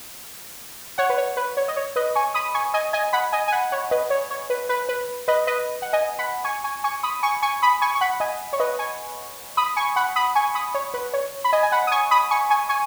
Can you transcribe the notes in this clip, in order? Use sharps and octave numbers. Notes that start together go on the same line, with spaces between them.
C#5 F#5
B4
C#5
B4
C#5
D#5
C#5
B4 D#5
G#5 C#6
B5 D#6
G#5 C#6
D#5 G#5
D#5 G#5
F#5 B5
D#5 G#5
G#5
F#5 B5
C#5 F#5
B4 D#5
C#5
C#5
B4
B4
B4
B4 D#5
B4 D#5
F#5
D#5 G#5
F#5 B5
G#5 C#6
G#5 C#6
G#5 C#6
B5 D#6
G#5 C#6
G#5 C#6
B5 D#6
G#5 C#6
C#6
F#5 B5
D#5 G#5
C#5
B4 D#5
G#5 C#6
B5 D#6
G#5 C#6
F#5 B5
B5 D#6
G#5 C#6
B5 D#6
C#5
B4
C#5
B5
D#5 G#5
G#5
F#5 B5
D#6
G#5 C#6
B5 D#6
G#5 C#6
G#5 C#6
G#5 C#6